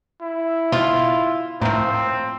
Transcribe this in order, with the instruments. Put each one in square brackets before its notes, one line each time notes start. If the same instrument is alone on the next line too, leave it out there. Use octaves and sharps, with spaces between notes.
[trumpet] E4
[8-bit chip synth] B2 [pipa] F4
[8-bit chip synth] A2 [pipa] F3 A#3 [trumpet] C4